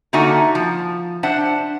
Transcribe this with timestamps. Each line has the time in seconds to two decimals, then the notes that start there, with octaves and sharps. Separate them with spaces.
0.13 D3 A#3 D#4 F#4 E5 G#5
0.55 F3
1.23 D4 C5 E5 F#5